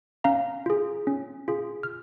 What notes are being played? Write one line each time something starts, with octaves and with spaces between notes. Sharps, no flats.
C#4 F5 A#5
F4 G#4
C#4
F4 G#4
F6